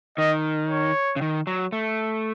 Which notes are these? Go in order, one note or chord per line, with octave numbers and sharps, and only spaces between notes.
D#3 D#5
C#5
C#3
D#3
F#3
A3